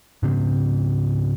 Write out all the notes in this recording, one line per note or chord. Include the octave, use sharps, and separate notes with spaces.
G#2 C#3 C4